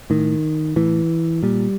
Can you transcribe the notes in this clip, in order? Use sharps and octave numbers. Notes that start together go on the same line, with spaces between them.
A2 D#3
A2 E3
A#2 G3